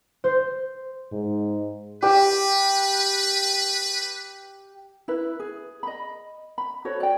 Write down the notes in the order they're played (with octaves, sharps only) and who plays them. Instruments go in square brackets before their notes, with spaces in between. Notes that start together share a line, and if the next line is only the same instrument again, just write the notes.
[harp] C5
[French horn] G#2
[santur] G4 E6 [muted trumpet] B4
[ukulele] E4 B4
G#4
D#5 B5
B5
F#4 A4 C5 C#5
D5 G5